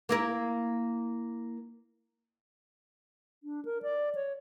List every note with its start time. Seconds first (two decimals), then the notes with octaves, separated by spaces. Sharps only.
0.09 A#3 E4 A#4
3.43 D4
3.65 A#4
3.82 D5
4.15 C#5